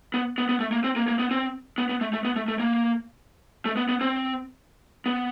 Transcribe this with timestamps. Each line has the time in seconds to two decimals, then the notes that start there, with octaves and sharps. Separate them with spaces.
0.14 B3
0.38 B3
0.49 B3
0.60 A3
0.72 A#3
0.84 C4
0.96 A#3
1.08 A#3
1.19 B3
1.31 C4
1.78 B3
1.89 B3
2.01 A3
2.13 A3
2.25 B3
2.36 A3
2.48 A3
2.60 A#3
3.65 A3
3.77 B3
3.89 B3
4.01 C4
5.06 B3